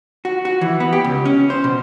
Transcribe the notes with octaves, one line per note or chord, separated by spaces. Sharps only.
F#4
F#4
E3
B3
G4
C#2
C#4
C5
B2